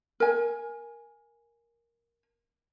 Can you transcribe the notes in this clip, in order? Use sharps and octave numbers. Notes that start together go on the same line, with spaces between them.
A#4 G#5